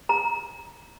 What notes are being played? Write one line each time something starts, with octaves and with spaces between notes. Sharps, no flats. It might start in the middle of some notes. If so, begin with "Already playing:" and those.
A#5